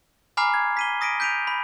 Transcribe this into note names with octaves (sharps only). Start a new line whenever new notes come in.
G#5 A#5 B5 D6 F6 C7
G#6
B6 D#7 G7
D#6 A#6 B6 D7 D#7
G6 B6 D7 D#7 F7
B5